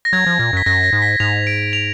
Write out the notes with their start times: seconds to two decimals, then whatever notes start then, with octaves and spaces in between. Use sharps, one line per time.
0.05 A#6
0.13 F#3 G#6
0.26 F3
0.39 A#2
0.53 F#2 B6
0.66 F#2 A#6
0.84 A#6
0.93 G#2
1.02 B6
1.20 G#2 F7
1.47 D7
1.73 F7